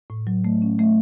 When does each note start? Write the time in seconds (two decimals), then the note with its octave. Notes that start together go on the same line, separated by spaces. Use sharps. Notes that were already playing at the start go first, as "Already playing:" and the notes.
0.10 A2
0.27 F#3
0.45 A3
0.62 C#4
0.79 A3